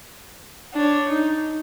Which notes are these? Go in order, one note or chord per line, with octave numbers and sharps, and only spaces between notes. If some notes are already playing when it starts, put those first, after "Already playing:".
D4 C#5
D#4